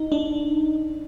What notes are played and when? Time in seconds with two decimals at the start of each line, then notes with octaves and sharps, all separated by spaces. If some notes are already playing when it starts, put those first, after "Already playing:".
Already playing: D#4
0.12 D4